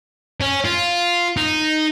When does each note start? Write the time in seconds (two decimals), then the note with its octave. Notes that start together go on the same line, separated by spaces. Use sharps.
0.41 C#4
0.65 F4
1.37 D#4